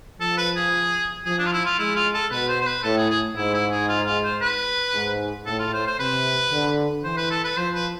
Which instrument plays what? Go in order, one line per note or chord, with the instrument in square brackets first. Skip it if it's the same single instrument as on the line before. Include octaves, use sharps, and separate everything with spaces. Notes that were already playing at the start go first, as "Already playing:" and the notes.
[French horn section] F3 [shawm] A4
[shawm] B4
G#4
[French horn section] F3 [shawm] G#4
[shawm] D4
F4
E4
F4
[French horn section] G#3 [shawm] E4
[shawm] F4
A4
[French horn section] B2 [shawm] B4
[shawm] C5
C5
B4
[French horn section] A2 [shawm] A4
[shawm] G#4
G#4
[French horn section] G#2 [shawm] E4
[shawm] E4
G#4
F4
F4
C5
B4
[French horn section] G#2
[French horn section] A2 [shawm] A4
[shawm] F4
C5
C5
[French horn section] C3 [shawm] B4
[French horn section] D3
[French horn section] E3 [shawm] C5
[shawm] B4
A4
B4
[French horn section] F3 [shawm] C5
[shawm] B4